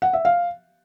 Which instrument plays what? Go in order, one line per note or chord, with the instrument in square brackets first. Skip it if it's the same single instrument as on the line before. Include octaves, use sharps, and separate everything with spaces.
[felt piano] F#5
E5
F5